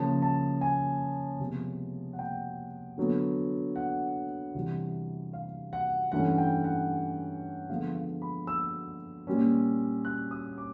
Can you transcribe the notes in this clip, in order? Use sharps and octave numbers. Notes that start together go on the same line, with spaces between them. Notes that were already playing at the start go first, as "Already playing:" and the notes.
Already playing: C#3 F3 A#3 A5
A5
G#5
C3 F3 G#3 B3
F#5
G5
D3 F#3 B3
F#5
C3 E3 G3 C4
F5
F#5
G2 E3 A3 C#4 F#5
G5
F#5
D3 F3 G#3 B3 F5
F5
B5
E6
A#2 G3 A#3 C#4
F#6
D#6
D6